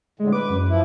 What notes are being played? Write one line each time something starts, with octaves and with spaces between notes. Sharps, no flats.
A2 D3 G#3
B4 D6
F#2
F3 E4